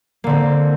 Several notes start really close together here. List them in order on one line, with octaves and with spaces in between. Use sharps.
A#3 D3 C4